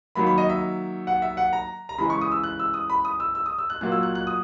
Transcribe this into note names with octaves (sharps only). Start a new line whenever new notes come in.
D#3 F#3 A#3 B5
B5
D#5
E5
F#5
E5
F#5
A#5
A#5
C#3 E3 G#3 B5
C#6
D#6
E6
F#6
E6
D#6
B5
D#6
E6
E6
D#6
E6
F#6
A#2 F#3 A#3 F#6
E6
F#6
F#6
D#6